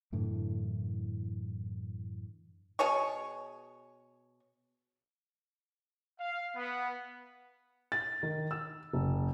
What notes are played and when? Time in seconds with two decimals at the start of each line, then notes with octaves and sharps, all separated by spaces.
0.12 F#2 A2 D3 E3
2.79 B2 G#4 C#5 C#6
6.20 F5
6.55 B3
7.92 A6
8.23 D#3
8.51 E6
8.93 F#1